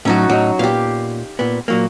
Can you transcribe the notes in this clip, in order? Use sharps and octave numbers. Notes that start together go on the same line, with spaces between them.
A2 F#3 C#4 D#4 F#4
A2 F#3 D#4
A#2 B3 G4 F5
A#2 B3
A#2 F#3 A#3